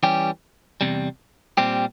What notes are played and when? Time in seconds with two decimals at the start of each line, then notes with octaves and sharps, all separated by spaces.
0.03 E3 G3 C#4 G4
0.81 E2 C3 G3
1.57 A#2 G3 C4 G4